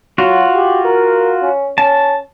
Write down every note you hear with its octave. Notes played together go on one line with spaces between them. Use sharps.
F#3 F4 F#4
G4
A#4
C#4
C#4 A5